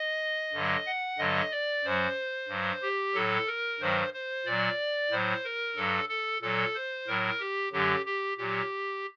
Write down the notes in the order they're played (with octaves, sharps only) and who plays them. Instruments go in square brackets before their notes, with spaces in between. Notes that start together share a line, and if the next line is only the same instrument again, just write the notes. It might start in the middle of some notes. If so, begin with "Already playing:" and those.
Already playing: [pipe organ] D#5
G2 D3 F#3
F#5
G2 D3 F#3 D#5
D5
F#2 F#3 C5
G2 F#3
G4
A2 F#3 A4
A#4
G2 D#3 F#3 C5
C5
A#2 F#3 D5
A2 F#3 C5
A#4
G2 F#3 A4
A4
A#2 F#3 A4
C5
A2 F#3 A#4
G4
F#2 D3 F#3 G4
G4
A#2 F#3 G4